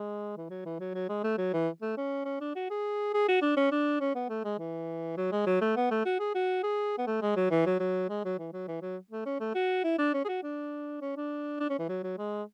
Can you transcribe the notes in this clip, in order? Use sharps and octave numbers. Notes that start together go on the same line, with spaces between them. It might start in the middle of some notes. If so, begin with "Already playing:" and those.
Already playing: G#3
E3
F#3
E3
F#3
F#3
G#3
A3
F#3
E3
A3
C#4
C#4
D4
F#4
G#4
G#4
F#4
D4
C#4
D4
C#4
B3
A3
G#3
E3
F#3
G#3
F#3
A3
B3
A3
F#4
G#4
F#4
G#4
B3
A3
G#3
F#3
E3
F#3
F#3
G#3
F#3
E3
F#3
E3
F#3
A3
C#4
A3
F#4
E4
D4
C#4
G#4
F#4
D4
C#4
D4
D4
C#4
E3
F#3
F#3
G#3